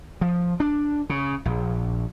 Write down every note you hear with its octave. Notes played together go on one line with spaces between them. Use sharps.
F3
D4
C#3
A#1